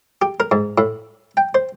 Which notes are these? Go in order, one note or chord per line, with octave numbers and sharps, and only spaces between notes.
G4
A#4
G#2
A2
G5
C5